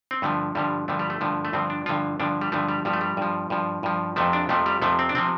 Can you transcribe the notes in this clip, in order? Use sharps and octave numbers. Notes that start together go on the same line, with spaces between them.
C4
G2 D3 F3 A3
G2 D3 F3 G3
G2 D3 F3 A3
G3
A3
G2 D3 F3
A3
G2 D3 F3 C4
D4
G2 D3 F3 F4
G2 D3 F3 D4
G3
G2 D3 F3 A3
G3
G2 F3 G3
A3
G3
G2 F3
G2 F3
G2 F3
F2 C3 F3 A3
D4
F2 C3 F3 A3
G3
F2 C3 F3 A3
C4
D4
C3 F3 C4